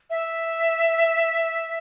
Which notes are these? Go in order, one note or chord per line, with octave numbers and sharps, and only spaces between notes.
E5